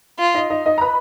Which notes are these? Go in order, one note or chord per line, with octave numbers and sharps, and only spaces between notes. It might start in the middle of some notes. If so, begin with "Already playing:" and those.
F4
D#4 D#5
D#4 D#5
D#4 D#5
A#5
B4 B5